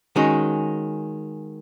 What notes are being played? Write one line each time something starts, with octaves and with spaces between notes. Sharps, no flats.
D#3 G#3 C#4 F#4